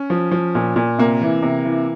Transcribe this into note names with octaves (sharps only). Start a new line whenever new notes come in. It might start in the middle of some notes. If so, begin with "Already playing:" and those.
Already playing: C#4
F3
F3
A#2
A#2
C3 A#3
E3
C3
E3